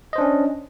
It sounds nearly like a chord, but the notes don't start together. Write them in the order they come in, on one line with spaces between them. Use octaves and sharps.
D#5 C5 D4 C#4